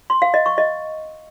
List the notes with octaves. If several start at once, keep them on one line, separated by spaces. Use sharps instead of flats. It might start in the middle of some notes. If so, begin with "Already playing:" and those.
C6
F5
D#5
C#6
D#5